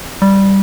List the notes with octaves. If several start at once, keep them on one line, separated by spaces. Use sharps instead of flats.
G3